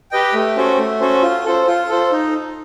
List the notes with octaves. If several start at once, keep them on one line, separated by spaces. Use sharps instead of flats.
G4 B4 D#5 G5
A3
C#4 F#4 A4 C5
A3
C#4 F#4 A4 C5
F4
A4 C5
F4
A4 C5
D#4